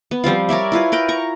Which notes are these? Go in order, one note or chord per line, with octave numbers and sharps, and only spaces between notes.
B3
F3 G3 C4 F4
A#4 C#5 D5 E5
E4 F4 B4
A#4 B4 G5
A#5 C#6